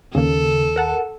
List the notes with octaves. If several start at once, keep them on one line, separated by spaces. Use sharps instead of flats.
D#2 C#3 A#3 A4
A#4 F#5 A5